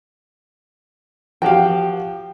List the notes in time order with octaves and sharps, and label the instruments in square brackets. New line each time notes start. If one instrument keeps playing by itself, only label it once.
[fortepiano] F3 F#4 G4 [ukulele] F5 G5